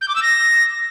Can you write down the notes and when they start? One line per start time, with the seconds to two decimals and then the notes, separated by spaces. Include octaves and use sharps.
0.01 G6
0.08 D6
0.16 E6
0.23 A#6